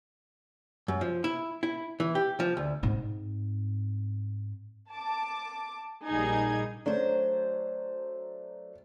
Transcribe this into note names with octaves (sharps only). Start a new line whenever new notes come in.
F#2
F3
E4
E4
E3
G4
F3
D2
G#2 C4
A5 D6
A#1 G3 A#3 D#4 G#4 G#6
F#3 A3 D4 C5